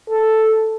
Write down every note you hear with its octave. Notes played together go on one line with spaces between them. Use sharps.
A4